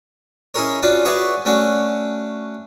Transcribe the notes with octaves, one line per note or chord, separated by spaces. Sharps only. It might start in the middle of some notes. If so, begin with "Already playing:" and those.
C#4 D#4 E4 G#4 A#4 C#5
C#4 D4 F4 F#4 D5
F#4 G#4 B4 C#5 D5 E5
A3 C#4 D4 F#4